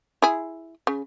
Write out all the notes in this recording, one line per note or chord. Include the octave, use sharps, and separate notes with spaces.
E4 G#4
C#3